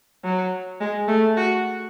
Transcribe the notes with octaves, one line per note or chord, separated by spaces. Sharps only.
F#3
G#3
A3
F#4